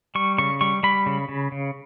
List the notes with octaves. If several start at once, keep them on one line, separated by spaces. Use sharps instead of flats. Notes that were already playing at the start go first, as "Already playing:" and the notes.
G3 C#6
C#3 C#6
G3 C#6
G3 B5
C#3
C#3
C#3